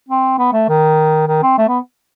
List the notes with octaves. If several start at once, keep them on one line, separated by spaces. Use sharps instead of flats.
C4
B3
A3
D#3
D#3
C4
A3
B3